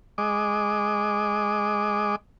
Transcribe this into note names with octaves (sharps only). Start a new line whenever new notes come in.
G#3 D#5 D6